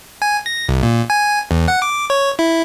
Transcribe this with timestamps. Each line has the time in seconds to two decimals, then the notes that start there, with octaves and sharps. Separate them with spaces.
0.22 G#5
0.46 A#6
0.69 C2
0.83 A#2
1.10 G#5
1.51 E2
1.68 F#5
1.82 D6
2.10 C#5
2.39 E4